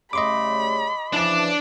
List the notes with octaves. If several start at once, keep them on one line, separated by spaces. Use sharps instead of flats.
C#3 G3 A3 D#5 B5 C6 D6
C#3 E3 F3 D4 D5